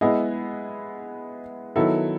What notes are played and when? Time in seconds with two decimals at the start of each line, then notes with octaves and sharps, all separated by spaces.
0.01 G#3 B3 E4 G#4 D#5
1.76 D#3 F#3 B3 E4 A4